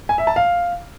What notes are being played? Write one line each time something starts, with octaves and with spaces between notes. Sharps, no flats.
G#5
E5
A5
F5